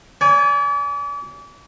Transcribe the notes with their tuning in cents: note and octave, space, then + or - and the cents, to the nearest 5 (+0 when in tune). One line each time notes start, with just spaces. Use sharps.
D5 -40 G#5 +0